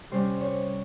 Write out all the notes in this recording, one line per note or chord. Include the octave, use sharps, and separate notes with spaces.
C3 G3 C#4 C5
C#5